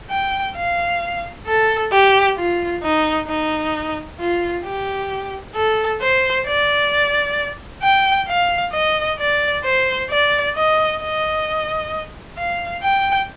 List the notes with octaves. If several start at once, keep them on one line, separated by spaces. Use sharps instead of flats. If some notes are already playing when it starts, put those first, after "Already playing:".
G5
F5
A4
G4
F4
D#4
D#4
F4
G4
A4
C5
D5
G5
F5
D#5
D5
C5
D5
D#5
D#5
F5
G5